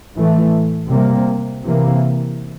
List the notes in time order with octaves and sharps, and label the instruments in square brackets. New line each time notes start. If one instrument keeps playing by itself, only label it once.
[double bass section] A2 E3 A3
C3 G3 A#3
C3 E3 A#3